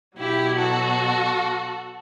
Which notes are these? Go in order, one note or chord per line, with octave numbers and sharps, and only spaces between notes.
B2 F#3 E4 G4
F#4 A4